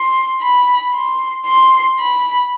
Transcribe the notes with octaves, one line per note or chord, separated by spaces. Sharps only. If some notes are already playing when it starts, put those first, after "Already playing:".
Already playing: C6
B5
C6
C6
B5